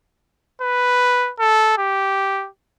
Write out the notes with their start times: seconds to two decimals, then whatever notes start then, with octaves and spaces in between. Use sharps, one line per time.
0.61 B4
1.39 A4
1.78 G4